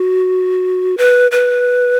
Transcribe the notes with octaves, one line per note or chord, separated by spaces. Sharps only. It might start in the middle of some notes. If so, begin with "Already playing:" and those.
Already playing: F#4
B4
B4